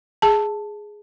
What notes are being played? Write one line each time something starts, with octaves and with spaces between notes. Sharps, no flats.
G#4 A5